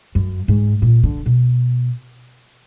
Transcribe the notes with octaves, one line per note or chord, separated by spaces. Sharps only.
F#2
G#2
A#2
D3
B2